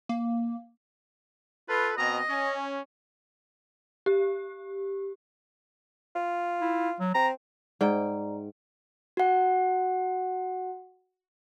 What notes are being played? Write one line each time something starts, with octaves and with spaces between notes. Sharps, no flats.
A#3
F4 A4 B4
B2 C4 D#5 A#5
C#4
G4
F4
E4
F#3
C4 A#5
G#2 D5 G5 A#5
F#4 F#5